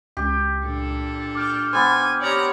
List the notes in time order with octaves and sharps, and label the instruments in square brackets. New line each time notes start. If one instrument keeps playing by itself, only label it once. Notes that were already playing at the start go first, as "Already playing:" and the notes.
[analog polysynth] C#2 [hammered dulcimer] G4
[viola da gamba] A#2 D4 A4
[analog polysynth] D6 F6 G6
[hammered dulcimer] B3 C5 [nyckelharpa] G#5
[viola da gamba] G4 C#5 [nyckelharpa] D5 A#5